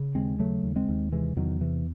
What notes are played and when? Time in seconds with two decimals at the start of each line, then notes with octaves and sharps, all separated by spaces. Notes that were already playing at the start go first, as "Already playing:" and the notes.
Already playing: C#3
0.15 D#2 G#3 C4
0.39 C#3 F#3 A3
0.63 D#2
0.76 G#3 C4
0.89 D#2
1.12 C3 E3 G#3
1.36 E2 D#3 F#3
1.61 C3 E3